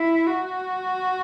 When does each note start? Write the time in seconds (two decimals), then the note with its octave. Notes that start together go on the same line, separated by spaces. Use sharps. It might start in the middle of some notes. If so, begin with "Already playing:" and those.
Already playing: E4
0.27 F#4